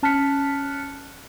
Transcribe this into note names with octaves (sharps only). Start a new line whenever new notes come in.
C#4 A5 F6 F#6 B6 C#7